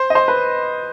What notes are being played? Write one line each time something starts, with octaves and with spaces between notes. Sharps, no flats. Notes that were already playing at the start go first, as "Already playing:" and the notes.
Already playing: C5
D#5
C5
B4